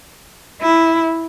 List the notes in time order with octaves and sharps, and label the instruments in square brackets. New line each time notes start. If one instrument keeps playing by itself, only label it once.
[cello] E4